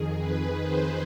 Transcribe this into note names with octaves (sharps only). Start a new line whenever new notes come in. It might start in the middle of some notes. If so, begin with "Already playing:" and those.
Already playing: F2 D#3 G#4
B4
C5